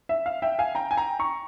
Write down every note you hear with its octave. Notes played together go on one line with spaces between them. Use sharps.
E5
F5
E5 G5
F5 G#5
G5 A#5
G#5
G5 A#5
A#5 C#6